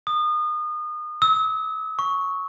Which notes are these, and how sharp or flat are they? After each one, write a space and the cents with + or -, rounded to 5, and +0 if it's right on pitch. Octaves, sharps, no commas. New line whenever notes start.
D#6 -30
E6 -40
C#6 +5